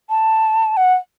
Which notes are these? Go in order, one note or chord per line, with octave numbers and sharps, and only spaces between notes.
A5
F#5